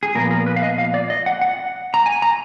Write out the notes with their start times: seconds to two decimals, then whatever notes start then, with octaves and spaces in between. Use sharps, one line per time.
0.03 G#4
0.15 A#2 F3 B3 A#4
0.31 A#4
0.46 B4
0.56 F5
0.62 D#5
0.78 F5
0.94 D5
1.10 D#5
1.26 F#5
1.41 F#5
1.94 A#5
2.06 G#5
2.22 A#5